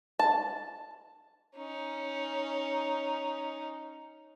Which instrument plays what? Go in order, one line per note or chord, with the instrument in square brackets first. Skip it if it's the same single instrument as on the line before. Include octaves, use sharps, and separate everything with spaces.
[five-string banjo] A5
[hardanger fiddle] C#4 D#4